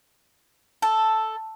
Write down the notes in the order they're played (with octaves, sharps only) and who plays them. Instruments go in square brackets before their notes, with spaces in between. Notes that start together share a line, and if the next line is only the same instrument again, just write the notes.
[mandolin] A4